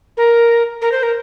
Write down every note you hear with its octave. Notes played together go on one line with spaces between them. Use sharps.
A#4
A#4
C5
A#4